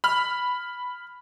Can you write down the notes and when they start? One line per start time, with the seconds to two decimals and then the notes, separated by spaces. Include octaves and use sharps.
0.04 B5 F6